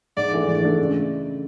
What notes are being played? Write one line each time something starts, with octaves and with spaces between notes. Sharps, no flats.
G#2 D5
E3 A3 D4
G#2 D5
E3 A3 D4
C#3